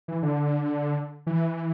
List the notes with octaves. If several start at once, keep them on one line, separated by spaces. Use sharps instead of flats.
E3
D3
E3